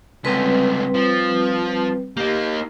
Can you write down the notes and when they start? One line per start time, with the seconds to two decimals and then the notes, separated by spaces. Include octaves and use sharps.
0.25 C#2 D3 G3 C4 B4
0.94 F3
2.17 A#3 D#4 G4